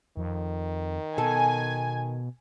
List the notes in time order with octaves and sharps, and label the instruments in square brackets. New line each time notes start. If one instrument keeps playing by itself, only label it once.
[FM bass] F2 [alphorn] D#3
[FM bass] B2 [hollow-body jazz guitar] A4 [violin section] G#5